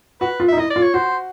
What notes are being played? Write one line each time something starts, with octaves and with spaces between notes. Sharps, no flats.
F#4 B4
F4
D#4 E5
E4 D#5
D5
F4
C#5
F#4 C5